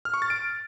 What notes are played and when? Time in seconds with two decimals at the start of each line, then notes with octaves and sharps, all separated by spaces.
0.05 F6
0.14 C#6
0.22 A6
0.30 D7